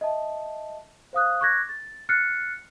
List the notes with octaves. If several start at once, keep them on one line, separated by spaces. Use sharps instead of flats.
D#5 E5 A5
C5 F5 D#6 F#6
C#6 D6 F#6 G#6 A#6
A6
F6 F#6 A6 C7 C#7